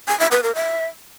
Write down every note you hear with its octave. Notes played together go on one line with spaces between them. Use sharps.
G#5
E5
B4
A#4
E5